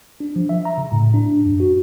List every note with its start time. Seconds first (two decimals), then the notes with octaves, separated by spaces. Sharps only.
0.20 D4
0.36 F3
0.49 E5
0.65 A#5
0.78 C#3
0.92 A2
1.14 D4
1.46 F#2
1.60 F#4